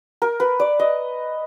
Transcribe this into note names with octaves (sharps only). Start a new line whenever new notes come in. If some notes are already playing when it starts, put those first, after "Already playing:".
A#4
B4
D5
D#5